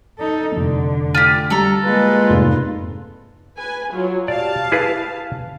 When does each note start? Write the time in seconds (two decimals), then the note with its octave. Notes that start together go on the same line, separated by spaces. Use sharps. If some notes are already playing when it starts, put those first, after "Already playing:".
0.19 D#4 A4
0.56 F1 D3
1.15 F4 G4
1.50 G3 A4 A#5
1.84 G#3 A#3 F4 B4
2.29 F1 G#2
3.57 B4 G#5
3.92 F#3 F4
4.28 G4 D5 F5 A5
4.72 E4 G#4 B4